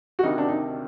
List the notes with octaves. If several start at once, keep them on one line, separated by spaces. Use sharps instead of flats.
F#4
D2 C3 D#3 D#4
D4
D#4